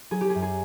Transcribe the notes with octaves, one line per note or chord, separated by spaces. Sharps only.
F#3 G#4
G4
G#4
F#2
G#4